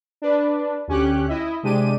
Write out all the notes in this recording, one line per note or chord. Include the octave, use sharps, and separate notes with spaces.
D4 B4
D2 C#4 G4 F#6
E4 D#5 E5
C3 G#3 D4 G4 D#7